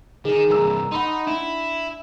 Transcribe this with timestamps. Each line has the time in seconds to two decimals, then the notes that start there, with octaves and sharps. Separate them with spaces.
0.25 D#3 G#4
0.50 C2 G2 A#4 A#5 E6
0.92 D#4 F#5 B5 C6
1.27 D4 E4